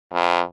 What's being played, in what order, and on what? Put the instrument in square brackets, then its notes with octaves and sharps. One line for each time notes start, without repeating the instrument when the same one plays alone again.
[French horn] F2